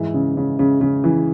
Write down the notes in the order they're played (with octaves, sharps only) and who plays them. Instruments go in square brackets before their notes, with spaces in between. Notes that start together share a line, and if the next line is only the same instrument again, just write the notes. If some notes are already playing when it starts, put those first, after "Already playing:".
Already playing: [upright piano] G#2 E3 E5
C#3
C#3
C#3
C#3
E3